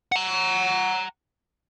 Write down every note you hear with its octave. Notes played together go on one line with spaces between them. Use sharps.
F#5 A#5